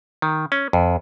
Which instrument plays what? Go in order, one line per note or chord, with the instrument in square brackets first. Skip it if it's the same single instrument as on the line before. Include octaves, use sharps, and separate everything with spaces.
[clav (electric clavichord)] D#3
C#4
F2